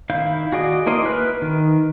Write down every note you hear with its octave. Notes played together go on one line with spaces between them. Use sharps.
D#3 E4 F5 G6
F#4 G#4 D5 D#5
A#3 E4 A#4 C5 D#5
B4 E5 B5 F6 F#6
D#3